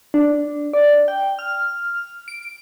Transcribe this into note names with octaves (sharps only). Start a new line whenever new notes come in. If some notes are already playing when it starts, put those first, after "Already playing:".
D4
D5
G5
F6
D7